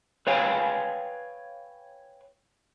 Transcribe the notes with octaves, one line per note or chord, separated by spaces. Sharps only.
B4 C#5 F5 G5 G#5